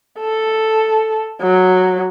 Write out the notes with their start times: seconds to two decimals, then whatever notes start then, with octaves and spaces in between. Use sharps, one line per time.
0.20 A4
1.42 F#3